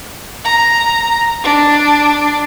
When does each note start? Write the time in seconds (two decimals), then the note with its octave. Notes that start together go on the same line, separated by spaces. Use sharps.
0.44 A#5
1.44 D4